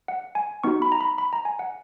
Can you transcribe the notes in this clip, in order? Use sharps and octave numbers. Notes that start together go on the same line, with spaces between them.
F#5
G#5
B3 D#4 F#4 C#6
B5
A#5
B5
B5
A#5
G#5
F#5